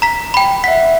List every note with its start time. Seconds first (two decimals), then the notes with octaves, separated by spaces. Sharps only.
0.02 A#5 B6
0.34 G5 B5
0.64 E5 F#5 B6